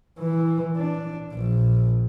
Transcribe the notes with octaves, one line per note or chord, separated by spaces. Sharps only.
E3
D4
A#1